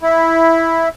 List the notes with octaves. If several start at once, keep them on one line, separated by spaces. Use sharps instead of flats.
E4